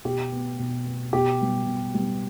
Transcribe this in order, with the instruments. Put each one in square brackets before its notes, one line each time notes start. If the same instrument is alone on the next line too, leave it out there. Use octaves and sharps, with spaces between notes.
[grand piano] B2 G4
B3
B2
B3
B2 G4
G3 B3
B2
G3 B3